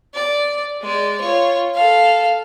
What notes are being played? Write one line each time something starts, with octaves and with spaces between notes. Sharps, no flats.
D5
G#3 D5
F4 C#5
A4 F5